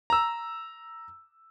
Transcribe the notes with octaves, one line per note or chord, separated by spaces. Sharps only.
A#5 E6